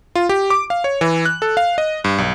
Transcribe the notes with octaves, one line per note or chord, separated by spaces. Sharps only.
F4
G4
D6
F5
C#5
E3
F#6
A4
F5
D#5
G2
B1